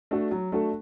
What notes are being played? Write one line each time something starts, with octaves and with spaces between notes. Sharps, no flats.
A3 D4 F#4 A4
F#3
A3 D4 F#4 A4